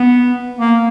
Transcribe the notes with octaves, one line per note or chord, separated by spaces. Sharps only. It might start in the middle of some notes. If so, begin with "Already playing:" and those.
Already playing: B3
A#3